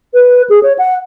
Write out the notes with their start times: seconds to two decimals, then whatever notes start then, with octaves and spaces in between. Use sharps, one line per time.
0.14 B4
0.50 G#4
0.63 C#5
0.79 F#5